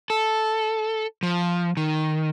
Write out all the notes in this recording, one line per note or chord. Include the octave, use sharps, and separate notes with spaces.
A4
F3
D#3